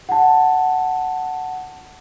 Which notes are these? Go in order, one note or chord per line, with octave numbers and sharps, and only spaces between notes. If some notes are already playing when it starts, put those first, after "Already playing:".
F#5 A5